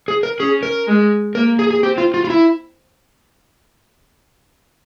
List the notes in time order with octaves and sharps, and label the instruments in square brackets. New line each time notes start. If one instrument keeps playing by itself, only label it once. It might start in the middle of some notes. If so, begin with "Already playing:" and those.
[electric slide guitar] G#4
A#4
[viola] C#4 [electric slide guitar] G#4
[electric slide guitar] A#4
[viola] G#3
[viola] A#3 [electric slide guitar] A#4
[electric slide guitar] G#4
G#4
[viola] C4 [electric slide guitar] G4
[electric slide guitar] F4
F4
F4
E4